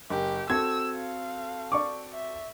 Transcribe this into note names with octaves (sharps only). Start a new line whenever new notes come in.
F#1 G4
C4 F#4 A4 E6 G#6
F5
D5 C#6 D6
E5